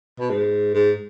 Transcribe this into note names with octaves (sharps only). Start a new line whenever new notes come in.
B2
G#2
G#2